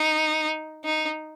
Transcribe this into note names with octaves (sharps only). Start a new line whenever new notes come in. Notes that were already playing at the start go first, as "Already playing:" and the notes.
Already playing: D#4
D#4